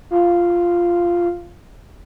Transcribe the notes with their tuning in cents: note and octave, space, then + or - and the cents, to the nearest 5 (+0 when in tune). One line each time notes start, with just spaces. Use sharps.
F4 -5